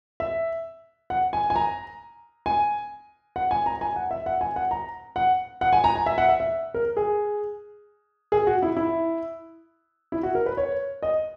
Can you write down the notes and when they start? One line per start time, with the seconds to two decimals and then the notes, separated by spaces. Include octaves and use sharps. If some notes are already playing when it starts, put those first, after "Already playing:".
0.20 E5
1.10 F#5
1.33 G#5
1.50 G#5
1.56 A#5
2.46 G#5
3.36 F#5
3.51 G#5
3.66 A#5
3.81 G#5
3.96 F#5
4.11 E5
4.26 F#5
4.41 G#5
4.56 F#5
4.71 A#5
5.16 F#5
5.61 F#5
5.73 G#5
5.84 A#5
5.96 G#5
6.06 E5
6.18 F#5
6.29 E5
6.40 E5
6.74 A#4
6.97 G#4
8.32 G#4
8.47 F#4
8.62 E4
8.77 E4
10.12 E4
10.23 F#4
10.35 A#4
10.46 B4
10.57 C#5
11.03 D#5